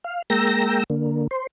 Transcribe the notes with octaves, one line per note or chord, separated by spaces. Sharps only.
F5
G#3 A#3 G5 A#5 E6 A#6
D3 A#3
C5